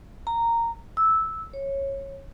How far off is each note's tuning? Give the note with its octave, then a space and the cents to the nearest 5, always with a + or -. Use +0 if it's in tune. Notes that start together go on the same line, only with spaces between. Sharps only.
A#5 -10
E6 -10
C#5 -15